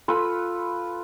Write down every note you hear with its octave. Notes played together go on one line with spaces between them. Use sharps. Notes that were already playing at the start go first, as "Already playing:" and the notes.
F4 A4 B4 B5